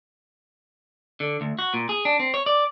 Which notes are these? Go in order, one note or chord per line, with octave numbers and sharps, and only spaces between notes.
D3
D2
F#4
A#2
G#4
D4
C4
C#5
D5